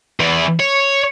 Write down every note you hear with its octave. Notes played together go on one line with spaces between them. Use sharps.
E2 E3
C#5